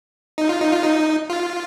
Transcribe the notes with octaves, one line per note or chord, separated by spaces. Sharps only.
D#4
F4
D#4
F4
D#4
F4